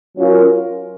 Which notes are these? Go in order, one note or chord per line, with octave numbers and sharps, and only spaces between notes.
F#3 C#4 F4 A#4